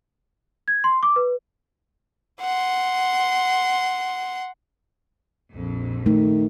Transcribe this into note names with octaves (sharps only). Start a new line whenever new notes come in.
G#6
C6
D6
B4
F#5 C6
A#1 F2
D#3 A3